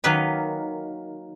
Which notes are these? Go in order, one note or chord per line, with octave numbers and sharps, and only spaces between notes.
D#3 F#3 A#3 B4 D#5